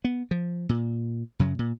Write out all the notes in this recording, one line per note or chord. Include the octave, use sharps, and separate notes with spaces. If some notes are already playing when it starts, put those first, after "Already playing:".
B3
F3
A#2
F#2 C#3 F#3
A#2